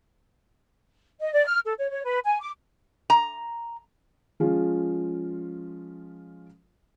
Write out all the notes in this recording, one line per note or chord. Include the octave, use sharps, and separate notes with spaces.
D#5
D5
F6
A4
C#5
C#5
B4
G#5
D6
A#5
F3 G#3 C#4 F4